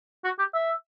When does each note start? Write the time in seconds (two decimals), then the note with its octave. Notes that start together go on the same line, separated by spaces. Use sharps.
0.25 F#4
0.39 G4
0.54 E5